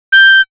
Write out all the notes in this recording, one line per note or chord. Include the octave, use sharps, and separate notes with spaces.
G6